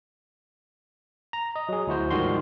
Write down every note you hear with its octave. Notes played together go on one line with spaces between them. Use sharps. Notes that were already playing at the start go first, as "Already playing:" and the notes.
A#5
D#5
F#3 G#4
D2 E4 F#4 C5
G#2 D#3 F3 G3 F#4 C6